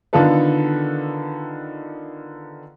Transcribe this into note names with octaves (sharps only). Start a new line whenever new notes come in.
D3 D#3 B3 F4 A4 B4